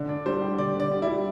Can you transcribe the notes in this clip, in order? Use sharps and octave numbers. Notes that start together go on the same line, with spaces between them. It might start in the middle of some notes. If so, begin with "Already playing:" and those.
Already playing: D3
D4
G3 C5
G4
D3 D5
D3 D5
G4
E4
G3